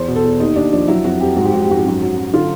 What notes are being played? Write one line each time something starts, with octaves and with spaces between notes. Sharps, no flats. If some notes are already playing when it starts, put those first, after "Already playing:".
Already playing: E2 C5
B2
A4
E2
D#2 D#4
D#2 D4
F3 D4
F#3 E4
F2 F#4
F2 G4
G#2 F#4
G4
G#2 F#4
G4
G#2 F#4
G4
F#2 F#4
F#3
F#2
D3 F4